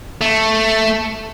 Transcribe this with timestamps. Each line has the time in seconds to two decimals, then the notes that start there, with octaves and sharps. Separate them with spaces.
0.21 A3